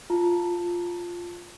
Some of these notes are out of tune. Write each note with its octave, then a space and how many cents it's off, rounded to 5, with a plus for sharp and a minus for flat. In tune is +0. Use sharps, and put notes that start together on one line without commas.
F4 +0 A5 +10